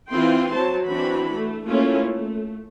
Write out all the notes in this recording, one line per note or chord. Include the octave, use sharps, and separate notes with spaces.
E3 C4 E4 F4 G5 C6
F#3 C5 A5
E3 C4 D4 F#4 B5
A3
A3 A#3 C#4 E4 F4
A3